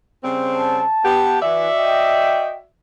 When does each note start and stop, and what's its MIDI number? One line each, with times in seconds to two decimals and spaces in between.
0.24 0.84 49
0.24 0.84 55
0.24 0.84 60
0.55 1.40 81
1.04 1.40 59
1.04 1.40 67
1.42 1.68 52
1.42 2.66 66
1.42 2.66 74
1.42 2.66 76
1.78 2.55 75
1.78 2.55 79